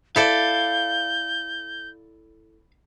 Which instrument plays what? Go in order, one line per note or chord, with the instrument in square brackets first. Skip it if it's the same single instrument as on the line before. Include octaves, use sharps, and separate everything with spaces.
[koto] E4 A4 D5 [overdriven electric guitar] F5 [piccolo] G6